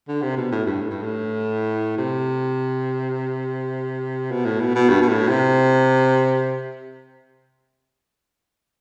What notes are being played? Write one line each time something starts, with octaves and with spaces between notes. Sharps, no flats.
D3
C3
B2
A2
G2
A2
G2
A2
C3
B2
A2
B2
B2
G2
B2
A2
C3